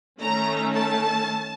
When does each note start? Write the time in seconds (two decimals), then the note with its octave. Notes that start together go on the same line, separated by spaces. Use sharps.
0.20 D#3 A3 C#4 A#5
0.75 A5